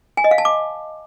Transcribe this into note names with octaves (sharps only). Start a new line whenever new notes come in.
G#5
D#5
F5
A5
D6